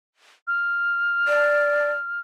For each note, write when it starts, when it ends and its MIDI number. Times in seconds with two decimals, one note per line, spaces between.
0.47 2.20 89
1.28 1.90 74